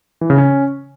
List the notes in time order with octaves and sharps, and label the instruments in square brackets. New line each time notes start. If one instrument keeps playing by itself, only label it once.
[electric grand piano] E3
C#3
C#4